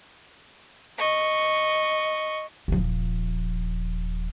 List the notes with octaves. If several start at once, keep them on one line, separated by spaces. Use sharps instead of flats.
D#5 C#6
D#1 F3